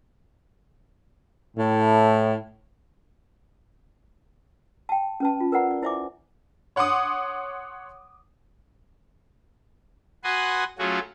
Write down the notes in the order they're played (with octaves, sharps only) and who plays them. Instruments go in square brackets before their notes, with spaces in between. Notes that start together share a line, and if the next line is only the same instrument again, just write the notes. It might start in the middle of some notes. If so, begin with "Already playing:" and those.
[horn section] A2
[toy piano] G5 A5
C#4 B4 A5
F4
A#4 B4 D5 F#5 A#5
D5
E4 C5 D5 E5 G#5 D6
[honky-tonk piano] C#5 F#5 C6 D6 D#6
[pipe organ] F#4 B4 F#5 G#5 C6 D#6
F#3 A3 C#4 F4 F#4 G#4